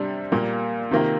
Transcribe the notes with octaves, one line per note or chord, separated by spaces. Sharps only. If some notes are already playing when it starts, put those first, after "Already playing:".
Already playing: C3 G3 D4
A#2 G3 A#3
C3 D#3 A#3 F4